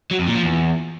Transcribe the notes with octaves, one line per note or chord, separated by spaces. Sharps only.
F#3
F2
A#2
F3
E2